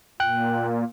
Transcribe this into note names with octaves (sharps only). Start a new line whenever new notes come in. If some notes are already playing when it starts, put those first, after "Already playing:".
A#2 G5 F#6